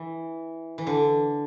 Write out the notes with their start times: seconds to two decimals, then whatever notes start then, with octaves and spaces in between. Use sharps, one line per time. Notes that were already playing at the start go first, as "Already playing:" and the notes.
Already playing: E3
0.78 E3
0.87 D3